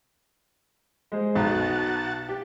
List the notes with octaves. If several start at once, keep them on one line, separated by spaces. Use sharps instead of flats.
G#3 C5
B1 F#4 A5
G4